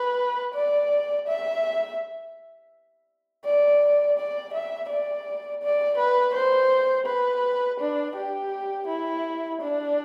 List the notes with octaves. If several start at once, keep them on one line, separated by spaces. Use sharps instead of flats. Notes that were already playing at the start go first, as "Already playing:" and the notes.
Already playing: B4
D5
E5
D5
D5
E5
D5
D5
B4
C5
B4
D4
G4
E4
D4